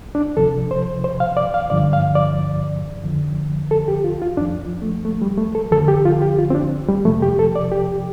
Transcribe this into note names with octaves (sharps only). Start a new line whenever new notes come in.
D4
C2 C3 F3 A4
C5
C5
F5
D5
F5
G2 D3 F3 D5
F5
D5
F2 D3 F3
A4
G4
F4
F4
F2 F3 D4
A3
A3
G3
A3
A4
F2 D3 F3 A4
G4
F4
G4
F4
C4
D4
G3
F2 C3 F3 A3
G4
A4
D5
G4